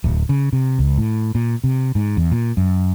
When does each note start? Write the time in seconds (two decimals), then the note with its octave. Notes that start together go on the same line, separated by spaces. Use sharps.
0.04 D1
0.29 C#3
0.53 C3
0.79 C#2
0.98 A2
1.35 A#2
1.64 C3
1.95 G#2
2.17 E2
2.32 A#2
2.57 F#2